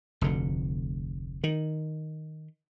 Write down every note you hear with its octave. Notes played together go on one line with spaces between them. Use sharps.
F1 D2 D3
D#3